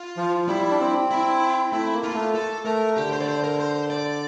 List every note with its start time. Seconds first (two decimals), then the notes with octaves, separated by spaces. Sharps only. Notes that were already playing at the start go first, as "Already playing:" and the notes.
Already playing: F4
0.17 F3
0.48 G3 E4
0.71 D4
0.80 C4
1.11 E4
1.72 A3 E4
1.93 A#3
2.04 F4
2.14 A3
2.35 A4
2.65 A3 A#4
2.97 D3 G4
3.12 C5
3.22 D5
3.28 C5
3.44 A#4
3.60 C5
3.90 D5